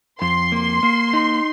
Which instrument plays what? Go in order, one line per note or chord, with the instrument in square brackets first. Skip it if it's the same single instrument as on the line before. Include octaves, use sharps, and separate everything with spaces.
[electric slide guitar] F2 [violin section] C6
[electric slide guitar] A#3
A#3
D#4